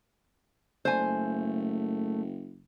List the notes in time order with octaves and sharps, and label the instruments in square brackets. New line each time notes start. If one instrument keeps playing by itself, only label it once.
[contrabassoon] F#1 [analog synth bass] A3 [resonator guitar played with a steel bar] C5 G#5